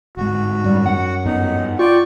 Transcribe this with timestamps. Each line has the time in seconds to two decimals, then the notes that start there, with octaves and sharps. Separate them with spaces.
0.17 G1 G#2 F#4
0.64 F#2 G3
0.86 F#5
1.25 G2 B3 D#4
1.79 F4 D5 G5 C#6